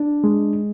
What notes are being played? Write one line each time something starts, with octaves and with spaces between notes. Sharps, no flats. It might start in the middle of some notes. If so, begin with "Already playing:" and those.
Already playing: D4
G#3